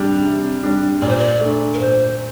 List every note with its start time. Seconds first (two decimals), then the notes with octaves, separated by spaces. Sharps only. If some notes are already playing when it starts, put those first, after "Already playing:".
Already playing: C3 G3 D4
0.24 C3
0.63 G3 D4
1.02 A#2 D5
1.09 C5
1.17 D5
1.40 A3
1.45 D4
1.74 A#4
1.79 A#2 C5